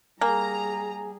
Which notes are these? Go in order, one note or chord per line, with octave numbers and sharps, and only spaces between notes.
G3 A#3 G#4 G#5 A#5